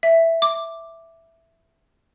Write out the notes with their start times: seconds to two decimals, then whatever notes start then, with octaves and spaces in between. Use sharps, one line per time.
0.03 E5
0.42 D6